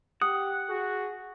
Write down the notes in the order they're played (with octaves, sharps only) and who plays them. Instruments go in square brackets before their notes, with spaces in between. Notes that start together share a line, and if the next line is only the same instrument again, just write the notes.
[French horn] G4 [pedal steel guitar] F#5 [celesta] D#6
[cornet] F#4 [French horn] G#4